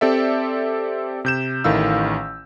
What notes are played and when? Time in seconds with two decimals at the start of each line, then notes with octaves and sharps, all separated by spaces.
0.01 C4 G4 A4 D5 E5
1.25 C3 G6 E7
1.64 A1 D#3 A3 E4 F5 E6